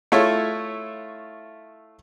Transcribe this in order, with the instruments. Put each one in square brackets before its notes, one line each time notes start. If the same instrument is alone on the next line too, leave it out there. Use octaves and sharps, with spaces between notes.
[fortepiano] A3 E4 F4 C#5 E5